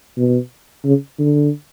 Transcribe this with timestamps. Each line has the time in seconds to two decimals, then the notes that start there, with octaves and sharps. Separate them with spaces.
0.18 B2
0.85 C#3
1.19 D3